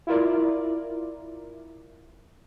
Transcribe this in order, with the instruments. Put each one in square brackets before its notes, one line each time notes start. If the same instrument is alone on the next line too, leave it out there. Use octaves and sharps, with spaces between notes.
[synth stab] E4 F4 A#4 D5